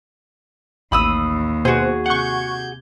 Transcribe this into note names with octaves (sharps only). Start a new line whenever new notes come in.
A1 D#2 B5 D#6 E6
B2 F#4 G#4 C5
C3 F#5 C#6 G6 G#6